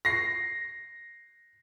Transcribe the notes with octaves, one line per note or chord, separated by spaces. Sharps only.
A#6 C7